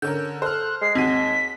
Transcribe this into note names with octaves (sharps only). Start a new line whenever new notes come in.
D3 C#4 A#4 G6
A4 C5 F6 F#6
G#3 C7
D#2 C4 F#4 B6 D#7